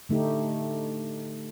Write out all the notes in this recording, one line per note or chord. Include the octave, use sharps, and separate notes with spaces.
D3 A3 D#4 G4